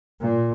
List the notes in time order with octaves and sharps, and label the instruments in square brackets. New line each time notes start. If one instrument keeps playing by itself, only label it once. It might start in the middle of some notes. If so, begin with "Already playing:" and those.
[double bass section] A#2